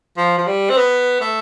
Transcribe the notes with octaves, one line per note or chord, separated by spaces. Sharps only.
F3
F3
G3
C4
B3
A3